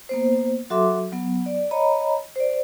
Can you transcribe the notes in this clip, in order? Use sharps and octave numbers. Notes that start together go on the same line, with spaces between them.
A#3 B3 C5
F#3 F#4 A4 E5 C6 D6
F#3 B3
D5
C#5 D#5 A#5 B5
C5 D5